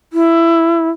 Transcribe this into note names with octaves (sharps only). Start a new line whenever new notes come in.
E4